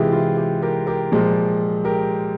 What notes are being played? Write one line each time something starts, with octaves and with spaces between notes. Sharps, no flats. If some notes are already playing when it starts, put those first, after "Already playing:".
Already playing: C3 E3 G#3 F4 G4 G#4
F4
G4
G4 A#4
G4 A#4
A#2 F3 G#3
G4 A#4